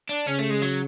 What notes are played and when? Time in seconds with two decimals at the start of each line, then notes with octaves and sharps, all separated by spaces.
0.09 D4
0.26 C#3 C#4
0.39 A3
0.50 G#3
0.62 F#3